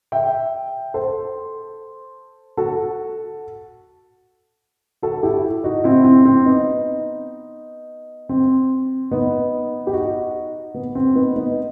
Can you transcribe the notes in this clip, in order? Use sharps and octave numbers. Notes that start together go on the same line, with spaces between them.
E5 G5
A4 C5
F#4 A4
F#4 A4
E4 G4
D#4 F#4
C4 E4
C4
C4
B3 D#4
C4
B3 D#4
G4
D#4 F#4
B3
C4
B3 D#4
B3 D#4